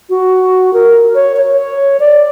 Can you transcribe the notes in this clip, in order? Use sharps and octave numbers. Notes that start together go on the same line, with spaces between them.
F#4
A#4
C#5
C#5
D5